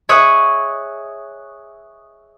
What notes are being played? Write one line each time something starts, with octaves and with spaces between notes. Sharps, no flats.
G#4 C#5 E5 C#6 D#6 F#6